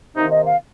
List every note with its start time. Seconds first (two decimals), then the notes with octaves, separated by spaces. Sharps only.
0.15 C3 D#3 A#3 D#4
0.30 D#5
0.46 F5